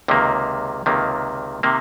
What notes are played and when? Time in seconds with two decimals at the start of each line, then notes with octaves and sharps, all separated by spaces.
0.08 C#2 C3 D#3 A#3
0.86 C#2 C3 D#3 A#3
1.63 C3 D#3 A#3